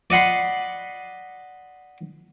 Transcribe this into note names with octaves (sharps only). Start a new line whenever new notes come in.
D5 D#5 F#5 B5 C6